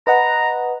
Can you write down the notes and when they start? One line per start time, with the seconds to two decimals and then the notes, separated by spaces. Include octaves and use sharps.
0.07 B4 D#5 F#5 A#5